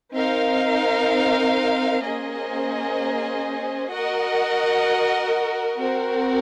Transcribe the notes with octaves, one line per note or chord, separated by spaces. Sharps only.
C4 D#4 A#4 F5
A#3 C#4 G#4 C5 D#5
F#4 A#4 D#5 F#5
C4 F#4 A#4